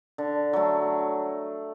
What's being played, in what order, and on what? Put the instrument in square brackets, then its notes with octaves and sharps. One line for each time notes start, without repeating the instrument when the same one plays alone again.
[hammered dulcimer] D3
F#3 A3